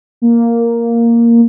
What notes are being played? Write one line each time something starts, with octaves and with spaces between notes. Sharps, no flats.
A#3